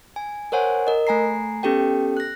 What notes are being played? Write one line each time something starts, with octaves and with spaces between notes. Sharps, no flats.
G#5
A#4 C5 C#5 F#5 G#5
A#4 D#5
A3 G#5 A#5 C7
B3 C#4 G4 A4 G5
F#6 A#6